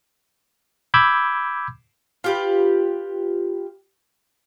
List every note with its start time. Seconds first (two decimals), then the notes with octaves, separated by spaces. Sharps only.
0.94 B5 D6 E6 G6 G#6
2.24 F4 G4 B4